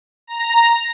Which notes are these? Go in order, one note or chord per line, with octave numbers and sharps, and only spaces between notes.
A#5